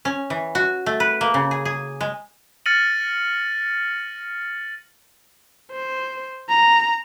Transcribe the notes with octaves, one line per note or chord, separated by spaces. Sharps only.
C#4
E3
F#4
A3
B4
A#3
C#3
G#4
G#4
G#3
F6 A6 A#6 C#7 D#7 F#7
C5
A#5